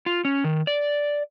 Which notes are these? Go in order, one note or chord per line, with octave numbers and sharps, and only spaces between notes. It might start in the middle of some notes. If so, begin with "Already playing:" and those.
F4
C#4
D#3
D5